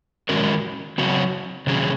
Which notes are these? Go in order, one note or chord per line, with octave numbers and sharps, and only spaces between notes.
D#3 G#3 C#4 F#4 A#4
C#3 F#3 C4 F#4
C3 D#3 F#3 C#4 G#4